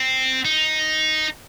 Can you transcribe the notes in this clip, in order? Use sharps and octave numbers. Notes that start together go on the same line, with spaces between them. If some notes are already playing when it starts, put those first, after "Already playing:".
Already playing: C4
D#4